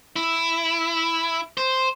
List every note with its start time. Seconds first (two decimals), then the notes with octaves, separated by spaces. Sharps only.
0.16 E4
1.57 C5